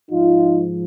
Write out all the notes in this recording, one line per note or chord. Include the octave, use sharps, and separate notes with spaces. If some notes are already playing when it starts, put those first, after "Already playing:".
G#2 F3 D#4 F4